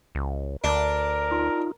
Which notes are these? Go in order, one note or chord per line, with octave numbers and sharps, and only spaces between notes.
C#2
D2 D4 A#4
D#4 F4